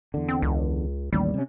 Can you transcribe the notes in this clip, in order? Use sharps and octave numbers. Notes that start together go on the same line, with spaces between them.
E2 D3
C4
C#2
A1 D#2 G3
C3 C#4